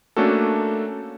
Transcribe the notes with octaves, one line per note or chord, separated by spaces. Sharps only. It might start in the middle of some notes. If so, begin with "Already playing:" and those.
A3 A#3 C#4 D4 F#4 A4